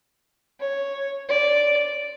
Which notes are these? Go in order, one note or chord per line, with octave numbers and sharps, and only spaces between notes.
C#5
D5